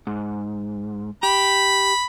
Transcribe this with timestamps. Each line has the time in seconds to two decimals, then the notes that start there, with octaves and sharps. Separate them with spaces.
0.07 G#2
1.23 G4 B5